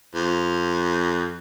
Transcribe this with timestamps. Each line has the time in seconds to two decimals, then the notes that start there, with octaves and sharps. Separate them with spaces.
0.14 F2